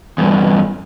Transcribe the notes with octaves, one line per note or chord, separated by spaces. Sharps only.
E2 G2